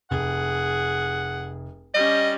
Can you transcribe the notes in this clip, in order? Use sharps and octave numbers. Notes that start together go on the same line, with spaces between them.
F1 G#4 F#5
G3 C#4 G4 D#5